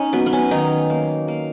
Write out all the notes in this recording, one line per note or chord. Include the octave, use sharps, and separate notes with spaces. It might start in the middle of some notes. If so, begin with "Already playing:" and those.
Already playing: C#4 D#4
F#3 B3
B3
C#4
D#3 D#4
A#3
A#3